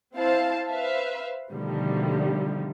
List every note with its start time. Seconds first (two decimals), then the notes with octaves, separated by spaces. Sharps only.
0.15 C4 E4 C5 F5 A5
0.69 B4 C5 E5 F5
1.50 B2 D3 D#3 F3 G3 A3